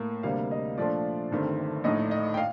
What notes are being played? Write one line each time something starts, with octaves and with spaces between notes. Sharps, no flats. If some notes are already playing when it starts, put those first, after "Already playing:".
Already playing: A2 A#3
D2 C3 G3 A#3 F5
D#5
A#2 F3 A3 D4 F4 D5
G1 G2 D#3 A3 C4
A#1 A2 A3 D#4 D#5
D#5
G5
F5